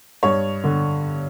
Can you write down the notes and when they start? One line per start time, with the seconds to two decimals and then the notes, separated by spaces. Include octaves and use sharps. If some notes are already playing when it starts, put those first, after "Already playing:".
0.23 G2 C#5
0.64 D3